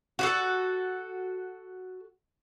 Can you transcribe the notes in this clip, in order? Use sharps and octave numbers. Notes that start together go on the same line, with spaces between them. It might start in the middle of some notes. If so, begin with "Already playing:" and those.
F#4 G4 A4